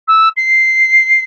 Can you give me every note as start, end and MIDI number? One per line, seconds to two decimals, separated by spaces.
0.07 0.28 88
0.36 1.23 96